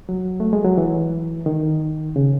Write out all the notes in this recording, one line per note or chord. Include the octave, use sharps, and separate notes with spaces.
F#3
A3
G#3
F#3
E3
D#3
C#3